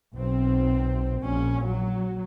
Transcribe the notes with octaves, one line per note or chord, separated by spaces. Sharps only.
B1 C4
A#1 C#4
F#3